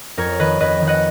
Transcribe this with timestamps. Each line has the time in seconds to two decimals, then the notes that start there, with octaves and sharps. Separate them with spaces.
0.17 F2 A#4 C#5
0.39 D#3 B4 D#5
0.60 F2 B4 D#5
0.81 D#3
0.87 D#5 F#5